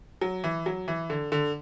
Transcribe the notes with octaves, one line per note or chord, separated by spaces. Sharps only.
F#3
E3
F#3
E3
D3
D3